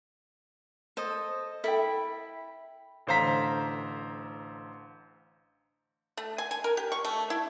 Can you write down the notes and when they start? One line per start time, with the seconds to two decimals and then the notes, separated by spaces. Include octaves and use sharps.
0.97 A4 C5 D#5
1.64 E4 A4 G5 B5
3.07 A1 D3 C5 F5 A#5 B6
6.17 A3
6.38 G#5
6.51 G#5
6.64 A#4
6.77 G4
6.92 C#6
7.05 A3
7.30 E4